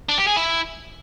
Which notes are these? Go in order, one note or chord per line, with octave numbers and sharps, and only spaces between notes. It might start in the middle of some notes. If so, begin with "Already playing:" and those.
D4
G4
G#4
E4